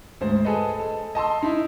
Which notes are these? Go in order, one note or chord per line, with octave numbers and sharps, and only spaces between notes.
D2 G#2 C5
G#4 A4 B4 D#5
A4
D#5 A5 C6 E6
D#4 E4